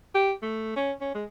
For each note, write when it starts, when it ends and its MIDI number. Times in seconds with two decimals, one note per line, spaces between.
0.15 0.32 67
0.42 0.72 57
0.76 0.92 61
1.01 1.11 61
1.15 1.25 56